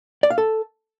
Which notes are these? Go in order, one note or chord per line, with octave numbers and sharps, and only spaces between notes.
D5
F5
A4